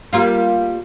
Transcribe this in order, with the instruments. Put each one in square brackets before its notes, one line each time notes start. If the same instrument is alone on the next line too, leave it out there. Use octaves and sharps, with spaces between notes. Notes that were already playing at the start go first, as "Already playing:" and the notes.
[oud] G3 A#3 F4